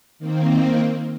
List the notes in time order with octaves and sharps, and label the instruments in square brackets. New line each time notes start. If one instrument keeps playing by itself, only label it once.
[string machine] D#3 A#3 C4